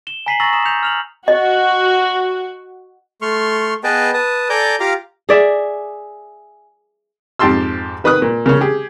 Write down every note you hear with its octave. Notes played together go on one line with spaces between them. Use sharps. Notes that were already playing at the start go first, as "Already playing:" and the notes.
E7 G7
G#5 A#5 B6 C7 D#7 F#7
A#5 C#6 E6 A6 A#6 F#7
A#5 D#6 E7
G6 C#7 F7
F6 F7 F#7
F#4 D#5
A3 C6 C#6 F6
B3 G#4 B4 D#5 G5 A5
B4 A5 D#6
A4 D5 G#5 A#5 D6 G6
F4 G4 F5 A#5 D6
G#4 D5 E5
F2 G#2 G4 A5 C6 E6
D#3 B4 B5 D#6 F#6
A#2
C#3 A#3 C#4
G4 G#4